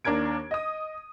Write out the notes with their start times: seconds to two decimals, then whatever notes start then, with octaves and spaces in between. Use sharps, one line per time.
0.05 D#2 D4 A#4 G#6 D7
0.51 D#5 D#6